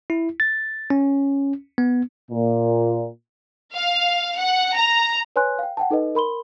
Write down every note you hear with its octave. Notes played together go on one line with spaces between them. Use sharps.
E4
A6
C#4
B3
A#2
F5
F#5
A#5
B4 C#5 G#5 C6 F#6
F5 G5
F#5 G5 A5
D#4 A4 B4 D#5
A#4 B5 C6 G7